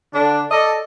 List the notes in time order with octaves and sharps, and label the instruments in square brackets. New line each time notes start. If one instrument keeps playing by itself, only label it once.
[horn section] D3 D4
A4 D5 D#5